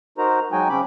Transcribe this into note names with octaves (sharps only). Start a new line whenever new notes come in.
D#4 F#4 A#4 C5 A#5
F#3 G#3 D#4 F#4 G5 G#5
C#3 C4 C#4 B5 D6